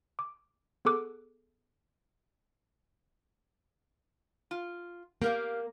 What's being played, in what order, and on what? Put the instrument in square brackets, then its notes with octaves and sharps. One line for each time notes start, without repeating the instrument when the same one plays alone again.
[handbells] D6
B3 G#4 A4 D6 F#6
[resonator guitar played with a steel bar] F4
[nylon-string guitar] A#3 [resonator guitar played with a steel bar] G4 A#4 F5